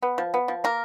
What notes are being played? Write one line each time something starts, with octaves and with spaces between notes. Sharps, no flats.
B3
F3
B3
F3
A#3 A#4